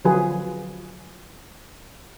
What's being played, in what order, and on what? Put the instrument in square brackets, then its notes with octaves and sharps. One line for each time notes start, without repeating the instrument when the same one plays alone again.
[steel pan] D3 F3 F#3 F4 G#4 B4